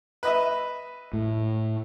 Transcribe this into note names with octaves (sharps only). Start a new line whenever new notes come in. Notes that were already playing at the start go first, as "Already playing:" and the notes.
B4 D#5 E5
A2